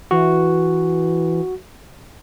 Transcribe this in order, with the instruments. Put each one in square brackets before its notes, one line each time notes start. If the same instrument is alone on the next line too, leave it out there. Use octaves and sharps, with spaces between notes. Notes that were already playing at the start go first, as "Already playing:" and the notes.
[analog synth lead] E3 [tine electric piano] F#4